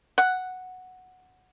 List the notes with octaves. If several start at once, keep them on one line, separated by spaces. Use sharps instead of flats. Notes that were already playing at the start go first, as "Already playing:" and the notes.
F#5